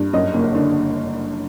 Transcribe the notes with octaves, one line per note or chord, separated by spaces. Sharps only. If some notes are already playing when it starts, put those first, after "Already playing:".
Already playing: G2
F#2 D#5
F#1
D3